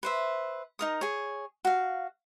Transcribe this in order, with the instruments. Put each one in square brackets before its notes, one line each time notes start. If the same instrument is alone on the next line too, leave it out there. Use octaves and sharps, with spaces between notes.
[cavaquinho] B4 C5 E5
D#4 A#4 D#6
G#4 C#5
F#4 F5